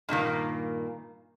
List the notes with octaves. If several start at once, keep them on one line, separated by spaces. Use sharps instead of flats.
G2 A#2 D#3 A#3